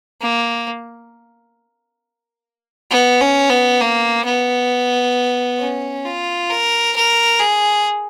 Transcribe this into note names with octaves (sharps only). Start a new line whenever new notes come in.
A#3
B3
C#4
B3
A#3
B3
C#4
F4
A#4
A#4
G#4